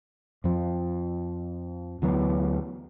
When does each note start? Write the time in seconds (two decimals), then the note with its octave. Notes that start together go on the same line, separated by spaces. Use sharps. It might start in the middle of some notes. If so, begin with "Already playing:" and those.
0.44 F2 F3
2.02 D2 E3 F#3 B3